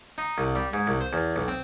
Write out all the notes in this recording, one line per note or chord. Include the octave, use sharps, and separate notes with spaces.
D#4
C2
G3
G#2
C2
C5
E2
B1
C4